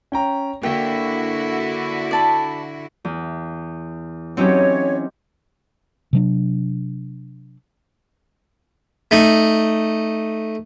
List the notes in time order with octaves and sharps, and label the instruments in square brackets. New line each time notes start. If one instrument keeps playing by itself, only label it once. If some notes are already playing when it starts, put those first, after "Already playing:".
[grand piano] C#4 G5 A#5
[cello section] D3 E4 F#4 [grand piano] A#3 [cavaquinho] C#5 G5
[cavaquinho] D5 A5 B5
[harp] E2
[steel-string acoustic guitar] E3 F#3 C#4 [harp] C4 D#4 G4 [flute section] C#5
[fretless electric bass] C3 F#3 D4
[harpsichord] A3 D#4